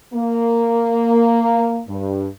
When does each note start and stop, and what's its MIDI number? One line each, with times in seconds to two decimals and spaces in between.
0.14 1.82 58
1.88 2.26 43